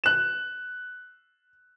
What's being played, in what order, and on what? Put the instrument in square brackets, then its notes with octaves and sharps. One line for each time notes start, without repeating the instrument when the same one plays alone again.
[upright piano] F#6 E7